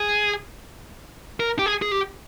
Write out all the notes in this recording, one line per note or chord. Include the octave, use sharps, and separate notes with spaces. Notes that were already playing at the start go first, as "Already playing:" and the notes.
Already playing: G#4
A#4
G4
G#4
G#4
G4